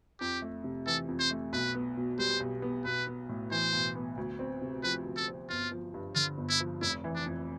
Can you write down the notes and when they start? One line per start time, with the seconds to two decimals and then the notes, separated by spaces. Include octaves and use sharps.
0.20 F2 G4
0.42 A3
0.64 C3
0.86 E3 A4
1.08 F2
1.19 C5
1.31 A3
1.53 B1 B4
1.75 B3
1.97 B2
2.19 G3 C5
2.40 B1
2.62 B3
2.85 B1 B4
3.07 B3
3.29 A2
3.51 E3 C5
3.73 B1
3.95 B3
4.17 D2
4.39 C4
4.62 C3
4.83 F3 B4
5.06 D2
5.16 A4
5.28 C4
5.49 G1 F4
5.72 F3
5.94 G2
6.15 D3 F4
6.38 G1
6.49 E4
6.60 F3
6.82 F1 E4
7.04 E3
7.15 D4
7.26 F2